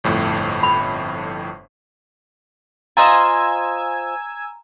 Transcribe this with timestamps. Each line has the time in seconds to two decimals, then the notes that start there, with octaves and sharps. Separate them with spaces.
0.04 G1 F2 A2
0.63 B5
2.97 F4 C5 D#5 G#5 A#5 E6 G#6